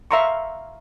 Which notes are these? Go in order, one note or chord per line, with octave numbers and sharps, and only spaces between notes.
E5 F5 A#5 C6 C#6